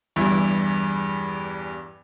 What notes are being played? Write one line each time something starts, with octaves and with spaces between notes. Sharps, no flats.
E2 G2 E3 E4